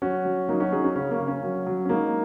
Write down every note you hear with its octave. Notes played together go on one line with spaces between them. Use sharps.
F#3 C#4 F#4
F#3
F#3 A#3 D#4
C#4 F#4
F#3 D#4 G#4
C#4 F#4
C#3 C#4
A#3
C#3
C#4
F#3
F#3
C#4
G#3 A#3 D#4